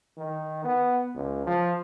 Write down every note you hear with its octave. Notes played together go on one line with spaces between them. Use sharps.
D#3
B3
C#2
F3